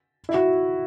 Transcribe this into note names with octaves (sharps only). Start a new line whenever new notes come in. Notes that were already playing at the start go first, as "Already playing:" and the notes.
E4
F#4